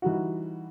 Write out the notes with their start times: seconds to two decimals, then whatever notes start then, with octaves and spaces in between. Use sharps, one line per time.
0.02 E3 G3 D#4 F#4